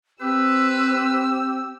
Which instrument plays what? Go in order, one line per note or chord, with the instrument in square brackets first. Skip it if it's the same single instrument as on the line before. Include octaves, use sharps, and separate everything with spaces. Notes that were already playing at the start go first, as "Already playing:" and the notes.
[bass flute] C4 [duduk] G4 [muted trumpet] B4 [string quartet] E6